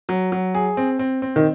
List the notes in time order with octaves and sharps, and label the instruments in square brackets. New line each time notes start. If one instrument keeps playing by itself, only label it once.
[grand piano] F#3
F#3
G#4
C4
C4
C4
[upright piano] D#3